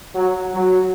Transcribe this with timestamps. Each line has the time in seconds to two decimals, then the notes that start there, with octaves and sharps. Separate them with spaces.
0.15 F#3
0.53 F#3